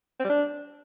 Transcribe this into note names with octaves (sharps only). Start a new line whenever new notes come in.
C4
G3
D4